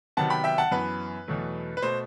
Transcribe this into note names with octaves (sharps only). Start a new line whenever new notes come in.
C3 D#3 F#3 B3 F#5 A5
G5 B5
E5 G5
F#5 A5
F#2 E3 B3 B4
E2 B2 F#3 A3
B4
B2 A3 C5